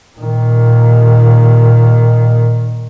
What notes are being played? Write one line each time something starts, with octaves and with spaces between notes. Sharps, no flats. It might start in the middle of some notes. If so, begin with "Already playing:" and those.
A#2 D#3